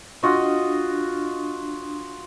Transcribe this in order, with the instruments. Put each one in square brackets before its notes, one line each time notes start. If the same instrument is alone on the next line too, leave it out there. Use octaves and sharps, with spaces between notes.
[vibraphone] D4 [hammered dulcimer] F4 F#4 D#5